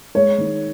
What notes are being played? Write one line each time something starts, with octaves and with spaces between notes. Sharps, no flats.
G#3 C#5
D#3